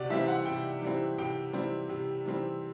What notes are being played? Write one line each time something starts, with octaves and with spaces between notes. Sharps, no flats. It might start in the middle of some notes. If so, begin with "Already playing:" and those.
Already playing: C3 F#4 D5
E3 G3 C4 E5
F#5
C3 G5
E3 G3 C4
C3 G5
E3 G3 C4
C3
E3 G3 C4